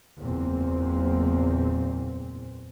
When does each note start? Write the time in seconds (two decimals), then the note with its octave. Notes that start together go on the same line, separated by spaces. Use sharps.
0.21 F#1 E2 A#2 A#3 C4